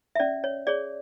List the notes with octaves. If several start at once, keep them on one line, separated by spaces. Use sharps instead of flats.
E5
C#4 D5
C#5
G#4 C#5 D5